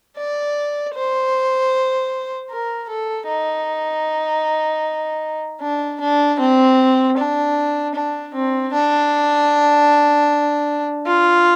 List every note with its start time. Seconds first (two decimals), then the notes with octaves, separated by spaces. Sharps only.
0.17 D5
0.94 C5
2.50 A#4
2.89 A4
3.27 D#4
5.61 D4
6.00 D4
6.39 C4
7.17 D4
7.95 D4
8.34 C4
8.73 D4
11.06 F4